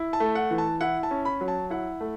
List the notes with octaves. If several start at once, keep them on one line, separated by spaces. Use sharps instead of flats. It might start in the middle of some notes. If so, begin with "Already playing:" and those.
Already playing: E4
A5
A3
F#5
E3
A5
E4 F#5
A5
C#4
B5
F#3
A5
E4 F#5
A3